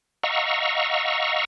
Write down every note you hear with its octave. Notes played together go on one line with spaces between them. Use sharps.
D#5 F5 F#5 A#5 C#6 E6